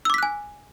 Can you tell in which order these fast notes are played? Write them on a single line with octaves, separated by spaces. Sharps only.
E6 D6 B6 F#6 G#5